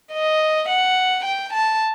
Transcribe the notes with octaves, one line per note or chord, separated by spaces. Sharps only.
D#5
F#5
G5
A5